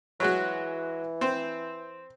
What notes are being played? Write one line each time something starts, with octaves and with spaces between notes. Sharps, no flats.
E3 F#3 G#3 F#4
C4 C5